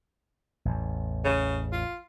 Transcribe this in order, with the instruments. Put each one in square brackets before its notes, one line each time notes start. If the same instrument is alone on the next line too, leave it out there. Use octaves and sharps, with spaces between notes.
[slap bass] A1 E2
[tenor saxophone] C#3
F4